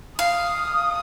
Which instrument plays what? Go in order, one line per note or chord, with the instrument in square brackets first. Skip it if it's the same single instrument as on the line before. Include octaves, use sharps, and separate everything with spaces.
[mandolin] F5 [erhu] D#6